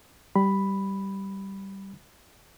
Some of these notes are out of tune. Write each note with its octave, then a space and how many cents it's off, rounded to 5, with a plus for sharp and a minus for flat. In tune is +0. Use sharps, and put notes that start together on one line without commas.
G3 -10 B5 +0